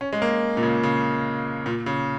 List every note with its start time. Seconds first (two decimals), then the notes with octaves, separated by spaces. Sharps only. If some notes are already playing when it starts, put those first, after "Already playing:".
0.01 C#4
0.13 G#3
0.22 A#3
0.57 A#2
0.63 C#3
0.83 C#3
1.66 A#2
1.86 C#3